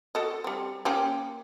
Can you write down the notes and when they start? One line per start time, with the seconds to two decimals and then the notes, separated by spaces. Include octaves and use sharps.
0.15 F#4 A4 D#5
0.44 G3 C4
0.85 A#3 C#4 G4